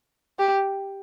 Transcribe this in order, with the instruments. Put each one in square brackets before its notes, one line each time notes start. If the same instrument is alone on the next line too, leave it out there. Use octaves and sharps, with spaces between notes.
[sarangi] G4